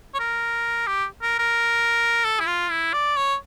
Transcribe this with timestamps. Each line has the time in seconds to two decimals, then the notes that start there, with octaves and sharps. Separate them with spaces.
0.14 C#5
0.19 A#4
0.87 G4
1.22 A#4
1.39 A#4
2.25 A4
2.40 E4
2.47 F4
2.70 E4
2.93 D5
3.17 C#5